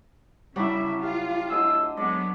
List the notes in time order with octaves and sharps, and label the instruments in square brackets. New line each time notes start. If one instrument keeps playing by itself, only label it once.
[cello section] C#3 E5 [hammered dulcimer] F#3 D4 [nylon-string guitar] G3 E4
[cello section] F4 [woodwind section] G4 F5
[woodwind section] A2 G4 E6 [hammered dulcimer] D3 D#5 G#5
[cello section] F#3 B3 [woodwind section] G#3 [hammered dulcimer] D5